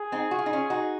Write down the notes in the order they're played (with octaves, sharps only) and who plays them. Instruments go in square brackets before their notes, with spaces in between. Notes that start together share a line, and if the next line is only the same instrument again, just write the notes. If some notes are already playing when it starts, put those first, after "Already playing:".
Already playing: [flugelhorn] G#4
[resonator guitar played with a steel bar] C4 D#4
F#4
F4
D#4
C#4 F4
D#4 F#4